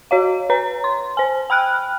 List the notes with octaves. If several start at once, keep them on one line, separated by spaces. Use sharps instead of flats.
F#4 C#5 F5
B4 C#5 A#5
C6
C5 G#5
G5 B5 F6 F#6